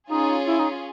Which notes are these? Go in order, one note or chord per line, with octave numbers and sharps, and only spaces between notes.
C#4 D#4 F4 G#4
E4
D#4